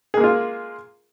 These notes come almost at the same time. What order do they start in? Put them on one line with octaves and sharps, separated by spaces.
G#4 A#3 G#3 F4